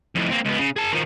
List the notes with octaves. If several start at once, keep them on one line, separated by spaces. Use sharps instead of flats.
F2 A2
A#3 C4
C#2 B3
C#3
G#4 A5
D#3 F3